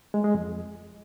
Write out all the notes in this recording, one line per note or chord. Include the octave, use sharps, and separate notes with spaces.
G#3
G#3
F2